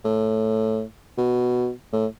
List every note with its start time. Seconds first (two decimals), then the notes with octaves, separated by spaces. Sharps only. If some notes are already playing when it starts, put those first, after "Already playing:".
0.05 A2
1.18 B2
1.93 A2